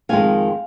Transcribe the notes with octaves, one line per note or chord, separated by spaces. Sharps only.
F2 D#3 G#3 F5 G#5